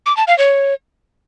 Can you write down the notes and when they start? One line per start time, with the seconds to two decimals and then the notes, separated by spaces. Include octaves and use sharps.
0.06 D6
0.17 A5
0.28 F5
0.38 C#5